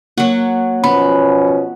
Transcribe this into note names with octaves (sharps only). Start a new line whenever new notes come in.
F#3 A#3 F#4
B2 F3 B3 C#4 B5